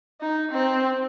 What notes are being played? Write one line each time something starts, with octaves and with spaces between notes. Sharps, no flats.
D#4
C4